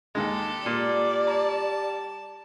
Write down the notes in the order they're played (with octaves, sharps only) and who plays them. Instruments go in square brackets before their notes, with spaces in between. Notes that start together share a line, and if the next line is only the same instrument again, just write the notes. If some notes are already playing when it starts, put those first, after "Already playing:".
[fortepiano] D#2 D#3 G#3 [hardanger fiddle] G4 A4
[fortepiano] A#2 [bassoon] G3 [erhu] D5
[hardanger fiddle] A5 [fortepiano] A#5